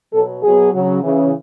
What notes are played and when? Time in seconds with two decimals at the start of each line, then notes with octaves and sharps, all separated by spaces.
0.13 B2 F#3 A4
0.43 B2 F#3 G#4
0.73 C#3 F#3
1.03 C#3 E3